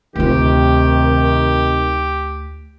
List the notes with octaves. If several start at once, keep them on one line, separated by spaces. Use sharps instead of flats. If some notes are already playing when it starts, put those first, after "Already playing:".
D2 C3 D#3 F4 G4